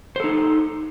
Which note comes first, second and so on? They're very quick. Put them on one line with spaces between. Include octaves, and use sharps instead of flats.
C5 A4 D#4